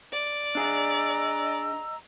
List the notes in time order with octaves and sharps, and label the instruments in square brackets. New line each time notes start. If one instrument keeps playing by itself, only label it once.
[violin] D5
[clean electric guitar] D4 G#4 [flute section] D#5 A#5 E6